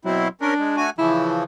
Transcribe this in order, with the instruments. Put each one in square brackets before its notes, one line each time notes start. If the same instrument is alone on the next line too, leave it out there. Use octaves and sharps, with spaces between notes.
[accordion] B2 C4 E4 [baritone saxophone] F#3
[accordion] C#4 A#4 [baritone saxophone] D4
[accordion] G#3
A3 F#4 G#5
[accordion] C#3 E3 F3 [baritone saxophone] E4